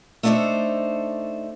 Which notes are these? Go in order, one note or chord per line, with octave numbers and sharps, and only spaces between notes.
A3 B3 D4 D#4 A4 C5